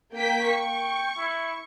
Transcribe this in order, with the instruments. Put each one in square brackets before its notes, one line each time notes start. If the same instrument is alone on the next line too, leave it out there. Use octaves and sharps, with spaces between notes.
[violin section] A#3 G5 B6
[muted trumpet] G5 [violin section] C#6
[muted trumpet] E4